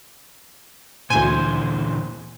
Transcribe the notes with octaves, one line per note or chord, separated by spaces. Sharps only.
D2 A#2 D3 E3 C5 G#5